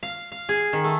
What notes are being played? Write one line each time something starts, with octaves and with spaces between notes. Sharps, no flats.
F5
F5
G#4
D#3
A3